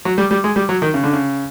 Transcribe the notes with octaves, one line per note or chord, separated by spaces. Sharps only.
F#3
G3
G3
G#3
G3
F#3
D#3
C#3
D3
C#3